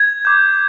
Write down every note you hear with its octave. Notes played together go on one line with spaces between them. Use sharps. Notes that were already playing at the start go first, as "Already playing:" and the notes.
Already playing: G#6
D6 G6